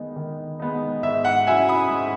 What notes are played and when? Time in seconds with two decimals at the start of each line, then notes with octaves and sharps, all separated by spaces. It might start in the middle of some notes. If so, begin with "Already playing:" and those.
Already playing: D#3 G#3 B3 D#4
0.16 D#3
0.60 G#3 B3 D#4
1.03 G#2 E5
1.25 F#5
1.47 F#3 C#4 E4 E5 G#5
1.69 B5 D#6
1.91 G#2